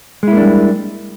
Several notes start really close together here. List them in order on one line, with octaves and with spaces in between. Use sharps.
G#3 E4 A#3 D4 G3